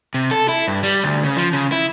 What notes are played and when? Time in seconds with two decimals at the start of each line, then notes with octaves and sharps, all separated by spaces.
0.14 C3
0.31 A4
0.49 E4
0.68 G2
0.83 G3
1.04 D2
1.23 C#3
1.37 F3
1.53 C#3
1.72 E4